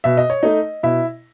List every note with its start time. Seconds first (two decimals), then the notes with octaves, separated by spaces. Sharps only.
0.04 B2 E5
0.17 D#5
0.30 C#5
0.43 A3 D#4 D#5
0.83 B2 E4 E5